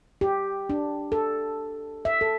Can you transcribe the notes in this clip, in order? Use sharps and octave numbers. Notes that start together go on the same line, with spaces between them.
G4
D4
A4
E5
A4